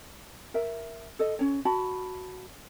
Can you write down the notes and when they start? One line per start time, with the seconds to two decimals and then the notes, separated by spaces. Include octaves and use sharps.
0.54 A#4 E5
1.19 A4 D#5
1.39 C#4 C#5
1.65 F#4 A5 B5